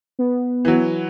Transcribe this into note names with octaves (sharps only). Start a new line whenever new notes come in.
B3
E3 F#3